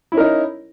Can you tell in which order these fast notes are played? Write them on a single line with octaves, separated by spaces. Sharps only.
E4 C#4 A#4 D#4